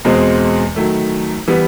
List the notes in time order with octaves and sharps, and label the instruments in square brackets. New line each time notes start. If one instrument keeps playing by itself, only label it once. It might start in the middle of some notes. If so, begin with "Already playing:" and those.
[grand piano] E2 B2 G#3 C4
D#3 F#3 A3
E3 G3 B3